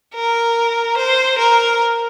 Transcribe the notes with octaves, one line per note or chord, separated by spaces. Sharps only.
A#4
C5
A#4